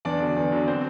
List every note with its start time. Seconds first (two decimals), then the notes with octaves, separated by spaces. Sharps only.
0.05 E2 D4 D5
0.20 D3 F#3
0.36 E2
0.52 D3 F#3
0.67 C4 C5